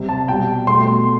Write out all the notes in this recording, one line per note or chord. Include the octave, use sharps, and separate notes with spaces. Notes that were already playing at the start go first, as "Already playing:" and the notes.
Already playing: C3 G3
A5
B2 G3 G5
B2 A3 C6